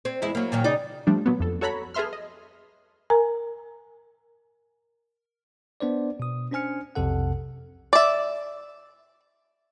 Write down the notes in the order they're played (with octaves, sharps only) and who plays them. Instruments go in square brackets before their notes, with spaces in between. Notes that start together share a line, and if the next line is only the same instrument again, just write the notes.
[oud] C4
E2 G#3 E4
F#3 A#3
A#2 D#3 F#3
C#3 D#4 D5
[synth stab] F3 G3 A3 D4
A#2 F#3 B3
F2 A4
F#4 A4 C#5 A#5 B5
G#4 A4 B4 E5 C6 F6
D#5
[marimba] A#4 G#5 A#5
[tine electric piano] B3 D4 C5 D5
B2 D#6
C#4 D4 C5 G#5 F6 C#7
B1 F2 C3 A4 F#5
[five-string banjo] D5 E5